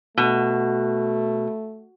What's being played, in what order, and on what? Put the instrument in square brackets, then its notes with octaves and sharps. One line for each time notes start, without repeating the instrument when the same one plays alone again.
[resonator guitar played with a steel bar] B2 [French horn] A3